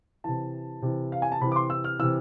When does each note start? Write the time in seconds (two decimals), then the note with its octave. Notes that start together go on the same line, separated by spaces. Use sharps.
0.24 C3 E3 A5
0.82 C3 E3
1.12 F5
1.22 G#5
1.32 A5
1.41 C3 E3 B5
1.52 D6
1.56 C6
1.70 E6
1.84 F6
1.99 C3 E3 E6